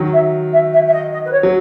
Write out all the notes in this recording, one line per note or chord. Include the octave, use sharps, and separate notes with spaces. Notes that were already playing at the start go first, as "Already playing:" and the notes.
Already playing: D#3 F#3
E5
E5
E5
E5
D#5
D#5
B4
C#5
F#3